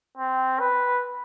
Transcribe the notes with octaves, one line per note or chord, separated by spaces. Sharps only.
C4
B4